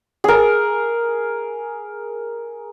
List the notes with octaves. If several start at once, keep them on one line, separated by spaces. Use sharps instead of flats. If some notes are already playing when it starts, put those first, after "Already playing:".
G#4 A#4